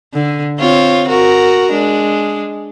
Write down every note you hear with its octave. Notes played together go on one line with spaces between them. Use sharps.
D3
C4 F4 C#5
F#4 A#4
G#3 D4